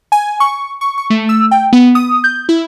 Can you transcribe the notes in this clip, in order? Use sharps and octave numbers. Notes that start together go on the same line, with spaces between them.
G#5
C#6
C#6
C#6
A3
E6
G5
B3
D#6
G6
E4